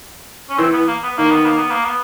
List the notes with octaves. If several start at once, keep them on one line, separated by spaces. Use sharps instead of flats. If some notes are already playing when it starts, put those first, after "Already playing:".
C#4
E3 C4
B3
A#3
B3
D#3 A#3
B3
A#3
B3
A#3
B3